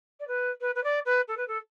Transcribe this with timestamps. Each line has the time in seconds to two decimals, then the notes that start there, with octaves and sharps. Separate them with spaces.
0.19 D5
0.27 B4
0.60 B4
0.75 B4
0.83 D5
1.05 B4
1.27 A4
1.37 B4
1.47 A4